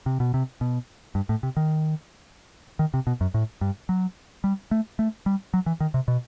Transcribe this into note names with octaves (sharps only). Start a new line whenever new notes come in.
C3
B2
C3
B2
G2
A2
C3
D#3
D#3
C3
B2
F#2
A2
G2
F#3
G3
A3
A3
G3
F#3
E3
D#3
C3
B2